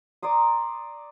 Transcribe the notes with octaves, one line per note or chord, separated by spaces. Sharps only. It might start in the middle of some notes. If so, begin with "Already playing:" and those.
D5 A#5 C6 D#6